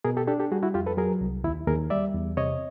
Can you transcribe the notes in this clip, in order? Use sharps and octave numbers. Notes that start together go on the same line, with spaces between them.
B2 G#4 A#4
G4 A4
D4 G4 A4
G4 A4
G3 F#4 G#4
E4 F#4
F2 F4 G4
A4 B4
F#3 G#4 A#4
C2
D#2 E4
D#2 G#4 A#4
G3 D5 E5
E2
C3 C#5 D#5